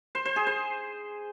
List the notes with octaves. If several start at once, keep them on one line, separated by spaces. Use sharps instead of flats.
C5
C5
G#4
C5